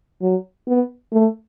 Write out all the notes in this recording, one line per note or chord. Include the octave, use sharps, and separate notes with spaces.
F#3
B3
A3